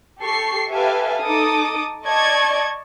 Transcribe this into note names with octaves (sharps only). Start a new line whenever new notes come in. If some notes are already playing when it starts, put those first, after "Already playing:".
G4 A4 C#6 C7
G4 A4 B4 E5 F5 G#5
D#4 A4 D6 D#6
D5 D#5 A5 C#6 G#6